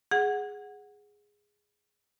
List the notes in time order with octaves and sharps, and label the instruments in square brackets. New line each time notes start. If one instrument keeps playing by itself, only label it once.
[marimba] G#4 F#5